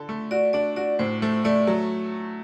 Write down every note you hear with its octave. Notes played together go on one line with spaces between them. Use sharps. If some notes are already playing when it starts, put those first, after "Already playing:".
Already playing: D3 A4
A3
F#4 D5
D4 D5
F#4 D5
A2 C5
A3 C5
A3 D5
F#3